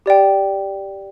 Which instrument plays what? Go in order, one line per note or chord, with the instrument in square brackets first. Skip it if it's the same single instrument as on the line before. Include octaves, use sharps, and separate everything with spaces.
[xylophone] G4 D5 G5